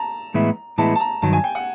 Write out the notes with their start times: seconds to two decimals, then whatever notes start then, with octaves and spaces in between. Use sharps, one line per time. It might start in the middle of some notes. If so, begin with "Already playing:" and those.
Already playing: A5 A#5
0.34 A2 E3 G#3 B3 E4
0.78 A2 E3 G#3 B3 E4 A5
0.96 A5
1.00 A#5
1.22 G2 D#3 F#3 A5
1.33 G#5
1.44 G5
1.55 F#5